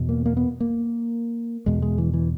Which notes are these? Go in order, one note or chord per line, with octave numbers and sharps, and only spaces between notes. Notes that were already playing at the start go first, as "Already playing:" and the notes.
Already playing: E2 B2
A#3
A#3
B3
A#3
E2 B2 G#3
G#3
E3
E3